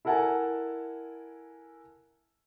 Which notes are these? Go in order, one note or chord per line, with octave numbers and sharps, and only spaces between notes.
E4 A4 A#4 F#5 G#5 A5